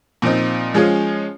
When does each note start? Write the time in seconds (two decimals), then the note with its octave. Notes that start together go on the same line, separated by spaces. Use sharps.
0.22 A#2 F3 C4 D#4
0.74 F3 G#3 C#4 F4 G#4